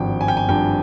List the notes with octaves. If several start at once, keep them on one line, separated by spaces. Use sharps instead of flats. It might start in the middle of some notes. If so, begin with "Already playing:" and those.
Already playing: G#1 G2 F3 G5
G#5
G5
G#5
G#1 G2 F3 G5